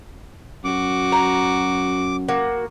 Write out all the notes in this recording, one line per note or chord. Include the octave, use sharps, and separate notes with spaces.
F#2 F#4 D6
A#5
A#3 F#4